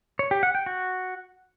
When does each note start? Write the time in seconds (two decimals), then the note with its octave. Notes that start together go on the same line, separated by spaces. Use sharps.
0.19 C#5
0.31 G4
0.43 F#5
0.55 G5
0.66 F#4